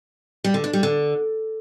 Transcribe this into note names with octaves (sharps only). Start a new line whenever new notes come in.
G3
D3
D4
G3
D3